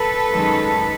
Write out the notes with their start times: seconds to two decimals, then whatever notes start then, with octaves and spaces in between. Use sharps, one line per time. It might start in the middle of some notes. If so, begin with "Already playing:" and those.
Already playing: A4 B4
0.31 F#2 D#3 G#3